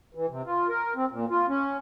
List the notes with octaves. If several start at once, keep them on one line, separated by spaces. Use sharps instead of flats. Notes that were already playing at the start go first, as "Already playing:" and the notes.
E3
C3
F4
A#4
C4
A#2
F4
C#4